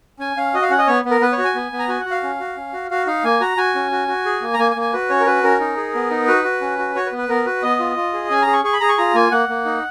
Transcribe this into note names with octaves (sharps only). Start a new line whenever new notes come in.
C#4 G#5
C#4 F5
F#4 D#5
F5
C#4 F#5
D#5
B3 C#5
B3
A#4
B3 B4
C#5
F#4
G#5
B3
B3
A#5
F#4 G#5
F#4 F#5
F5
C#4
F#4
C#4
F#4
F#4 F5
D#4 F5
A#3 G#5
F#4 A#5
F#4 G#5
C#4
F#4
F#4
G#4
A#3
A#5
A#3 G#5
G#5
A#3
G#5
F#4 B4
C#4 C#5
A#4
F#4 B4
C#4 A#4
D#4
G#4
B3
D#4
F#4 B4
F#4
C#4
F#4
F#4 C#5
B4
B3
B4
B3 A#4
F#4 B4
B3 D#5
F4
F4
G#4
C#4 G#5
G#4 A#5
C#6
G#4 C#6
B5
G#4 A#5
C#6
F4 A#5
A#3 G#5
A#3 F#5
A#3
D#4